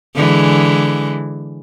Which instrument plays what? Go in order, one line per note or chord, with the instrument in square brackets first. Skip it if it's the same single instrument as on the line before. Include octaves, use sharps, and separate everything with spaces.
[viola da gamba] D3 E3 G#3